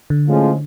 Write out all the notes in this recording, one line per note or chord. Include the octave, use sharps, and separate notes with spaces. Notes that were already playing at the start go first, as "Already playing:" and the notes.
D3
A2 F3 G#3 C#4